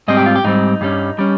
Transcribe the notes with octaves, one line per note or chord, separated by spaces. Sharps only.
G#2 G3 C4 D#5
G4
F4
G4
G#2 G3 C4 D#4
G2 G3 C#4
G3 C#4